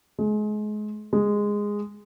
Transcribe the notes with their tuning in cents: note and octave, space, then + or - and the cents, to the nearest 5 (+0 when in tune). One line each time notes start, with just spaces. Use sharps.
G#3 +30
G#3 -10